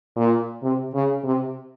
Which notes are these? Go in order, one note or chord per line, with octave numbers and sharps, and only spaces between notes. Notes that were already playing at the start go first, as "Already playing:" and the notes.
A#2
C3
C#3
C3